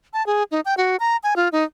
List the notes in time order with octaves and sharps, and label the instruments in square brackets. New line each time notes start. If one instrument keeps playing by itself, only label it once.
[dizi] A5
G#4
D#4
G5
F#4
A#5
G#5
F4
D#4